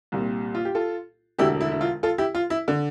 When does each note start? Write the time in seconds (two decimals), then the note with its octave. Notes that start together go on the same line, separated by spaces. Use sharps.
0.12 C2 A#2 G3
0.55 F4
0.65 G4
0.75 F4 A4
1.39 E1 D2 D3 E4 G4
1.61 E4
1.72 E4
1.81 F4
2.03 F4 A4
2.18 E4 G4
2.35 F4
2.50 E4
2.68 D3